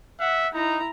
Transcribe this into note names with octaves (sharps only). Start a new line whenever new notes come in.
E5 F#5
D#4 E4 A#5